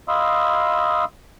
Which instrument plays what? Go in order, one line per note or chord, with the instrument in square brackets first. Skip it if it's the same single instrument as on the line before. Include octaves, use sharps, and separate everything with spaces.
[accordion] D#5 F5 B5 C6 D#6 E6